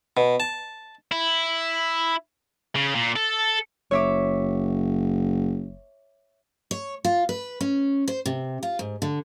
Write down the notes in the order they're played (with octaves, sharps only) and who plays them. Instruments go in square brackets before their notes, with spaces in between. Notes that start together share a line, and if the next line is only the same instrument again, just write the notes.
[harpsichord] B2
A5
[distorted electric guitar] E4
C#3
A#2
A4
[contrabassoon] F#1 [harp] C#5 E5 D6
[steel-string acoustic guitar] C#5
F4
B4
C#4
C5
C3
F4
G#2
D3